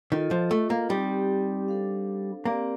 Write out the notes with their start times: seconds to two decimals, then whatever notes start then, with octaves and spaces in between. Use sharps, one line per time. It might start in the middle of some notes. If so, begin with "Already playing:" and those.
0.12 D#3 F4 A4 D#5
0.31 F3
0.51 A3
0.70 A#3
0.89 G3 C4 D#4 G4
1.68 D4 A4 C5 F5
2.45 A#3 C4 G4 D5